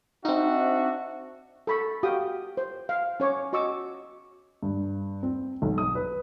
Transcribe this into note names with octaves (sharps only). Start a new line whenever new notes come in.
C4 D4 D#4 F#4 E5
A4 B5 C#6
F#4 G4 F5 G5 D#6
C5
F5
C#4 C#5 C#6 D6
F#4 D#5 C#6 D6 E6
G2
C4
B1
D#6
B4